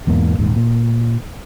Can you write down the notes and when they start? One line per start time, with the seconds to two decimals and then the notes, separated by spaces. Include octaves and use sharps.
0.07 E2 G#2 B2 A#3
0.39 D#1 G#2
0.56 A#2